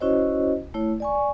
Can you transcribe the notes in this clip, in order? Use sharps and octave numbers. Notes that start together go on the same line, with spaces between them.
C#4 E4 F#4 C5 C#5 D#5
A3 E4 C#5
D5 G#5 C#6